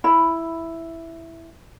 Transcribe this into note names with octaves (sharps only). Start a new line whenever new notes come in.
E4 B5